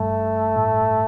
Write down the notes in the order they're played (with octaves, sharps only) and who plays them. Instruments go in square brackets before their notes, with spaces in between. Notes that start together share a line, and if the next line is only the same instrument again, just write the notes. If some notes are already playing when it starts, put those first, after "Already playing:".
Already playing: [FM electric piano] G2 [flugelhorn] A3
[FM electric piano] A2